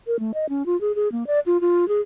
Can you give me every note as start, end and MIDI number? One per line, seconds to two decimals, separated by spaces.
0.07 0.19 70
0.19 0.32 57
0.34 0.46 75
0.49 0.65 61
0.66 0.79 65
0.81 0.95 68
0.95 1.08 68
1.12 1.27 58
1.27 1.40 74
1.46 1.60 65
1.61 1.88 65
1.88 2.01 68